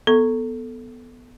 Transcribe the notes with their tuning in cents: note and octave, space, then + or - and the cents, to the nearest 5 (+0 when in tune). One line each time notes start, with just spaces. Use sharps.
B3 +0 A4 +0 C#6 +0